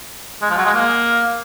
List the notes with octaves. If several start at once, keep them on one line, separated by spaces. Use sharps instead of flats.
G#3
F3
F#3
G#3
A#3